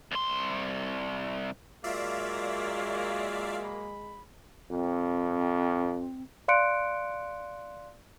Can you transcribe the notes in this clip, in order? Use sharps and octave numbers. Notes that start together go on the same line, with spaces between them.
C2 C6
F#3 G#3 A#3 F4 D5 E5 F5
B5
F2 C4
D5 F5 C6 F#6 C#7 D7